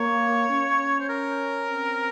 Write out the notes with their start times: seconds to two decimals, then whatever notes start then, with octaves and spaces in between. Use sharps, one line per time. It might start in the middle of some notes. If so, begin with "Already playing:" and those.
Already playing: A#3 C#5
0.49 C#4
1.00 C5
1.09 A#4
1.68 C4